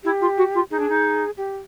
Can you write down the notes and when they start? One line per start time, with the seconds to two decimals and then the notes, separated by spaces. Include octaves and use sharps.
0.04 E4 G4
0.20 F4
0.37 F#4
0.54 F4
0.70 D#4 G#4
0.79 D4
0.89 D#4
1.37 G4